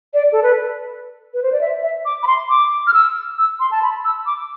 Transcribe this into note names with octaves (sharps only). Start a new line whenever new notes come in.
D5
A4
B4
B4
C5
D5
E5
E5
D6
B5
C6
D6
F6
E6
E6
C6
A5
B5
E6
D6